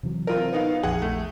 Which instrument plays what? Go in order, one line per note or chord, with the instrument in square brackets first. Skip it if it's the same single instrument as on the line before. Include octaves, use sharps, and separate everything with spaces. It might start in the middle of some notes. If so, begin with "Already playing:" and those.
[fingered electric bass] C3 E3 F#3
[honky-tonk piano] C4 F4 A#4
B3 D#4 F5
[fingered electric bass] A#1 F2 F3 [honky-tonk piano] G#4 F#5
[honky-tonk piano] A3